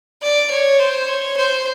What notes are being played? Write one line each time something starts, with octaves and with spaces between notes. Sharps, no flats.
D5
C#5
C5
C#5
C5